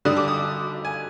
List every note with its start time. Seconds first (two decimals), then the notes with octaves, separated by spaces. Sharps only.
0.05 D3 G3 D4 D#6
0.17 D6
0.28 D#6
0.85 G#5